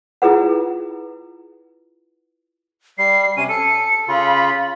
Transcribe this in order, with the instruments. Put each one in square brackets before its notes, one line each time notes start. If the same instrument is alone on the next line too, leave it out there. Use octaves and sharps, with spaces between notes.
[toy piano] E4 F4 G#4 B4 F#5
[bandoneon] G3 [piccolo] C7
[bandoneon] C3 C#4 [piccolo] D#7
[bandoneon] A4 [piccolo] C#7
[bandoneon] C#3 F4 [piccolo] B5